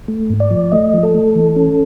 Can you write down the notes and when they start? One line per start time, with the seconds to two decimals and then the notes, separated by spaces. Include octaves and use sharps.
0.08 A3
0.30 G#2
0.40 D5
0.51 F3
0.72 A3 D#5
0.94 F3
1.03 A4
1.15 A3
1.35 E3
1.56 C#4